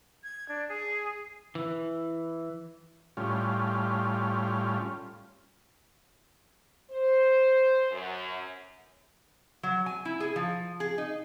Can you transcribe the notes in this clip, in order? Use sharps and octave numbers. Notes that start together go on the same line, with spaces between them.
G#6
D4
G#4
E3
A2 G3 C#4 F4
C5
F#2
F#3
G#5
E4
G#4
F3
G#4
D#4